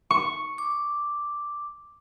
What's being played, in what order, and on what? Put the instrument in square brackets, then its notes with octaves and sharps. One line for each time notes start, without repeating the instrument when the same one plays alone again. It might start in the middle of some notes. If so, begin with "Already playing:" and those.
[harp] C#6
[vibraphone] D6